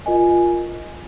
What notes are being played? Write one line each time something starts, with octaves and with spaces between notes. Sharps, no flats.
F4 A#4 D#5 G#5